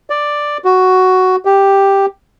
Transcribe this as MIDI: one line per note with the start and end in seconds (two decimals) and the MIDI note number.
0.10 0.58 74
0.65 1.36 66
1.45 2.06 67